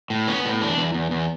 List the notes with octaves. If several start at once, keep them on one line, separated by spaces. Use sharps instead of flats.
A2
B3 C#4
A2
E2 D4
E2
E2
E2